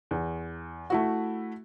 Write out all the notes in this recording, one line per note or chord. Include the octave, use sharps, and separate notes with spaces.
E2
A3 E4 F#4